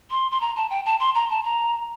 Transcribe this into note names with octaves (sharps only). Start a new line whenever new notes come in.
C6
C6
A#5
A5
G5
A5
C6
A#5
A5
A#5